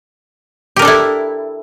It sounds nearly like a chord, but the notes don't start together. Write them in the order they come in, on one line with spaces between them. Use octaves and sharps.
G4 A#4 D4 A4 E4